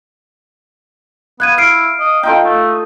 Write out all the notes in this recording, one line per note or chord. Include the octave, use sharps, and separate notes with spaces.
B3 F5 F#6 G#6 D#7
E4 F6 C7 D7
D#5
D#4 F4 A4 G5
A3